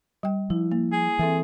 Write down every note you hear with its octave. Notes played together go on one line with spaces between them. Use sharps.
G3 G5
F3 E4
A#3
G#4
E3 C4 A4 E5